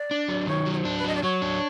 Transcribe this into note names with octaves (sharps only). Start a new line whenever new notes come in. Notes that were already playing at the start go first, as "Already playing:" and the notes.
Already playing: D5
D4
F#3
D#3 C#5
F#3
C#5
C5
D4
B4
F#3 D#5
D5
F#3 C#5
D4